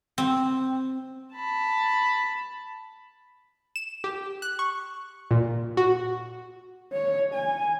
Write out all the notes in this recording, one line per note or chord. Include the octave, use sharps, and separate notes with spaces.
C4
A5 B5
E7
G4
F#6
C#6
A#2
F#4
C#5
G#5